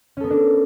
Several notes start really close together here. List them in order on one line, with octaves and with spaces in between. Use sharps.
C#4 A4 B3 A#4 D4